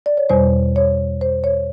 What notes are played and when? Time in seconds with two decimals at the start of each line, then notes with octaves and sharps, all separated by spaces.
0.06 D5
0.17 C#5
0.30 E2 B2 G3 C5
0.76 C#5
1.21 C5
1.44 C#5